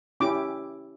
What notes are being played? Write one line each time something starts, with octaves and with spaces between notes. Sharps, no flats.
C#4 E4 G4 D6